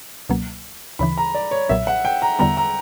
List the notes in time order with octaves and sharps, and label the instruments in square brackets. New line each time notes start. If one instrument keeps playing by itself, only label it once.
[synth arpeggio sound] C#2 B2 F#3 A#3
[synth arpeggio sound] D2 C#3 E3 [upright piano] B5
[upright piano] A#5
D5
C#5
[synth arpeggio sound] B1 A#2 F#3 [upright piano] E5
[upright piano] F#5
G5
A#5
[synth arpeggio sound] E2 D3 G3 B3 [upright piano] A#5
[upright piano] A#5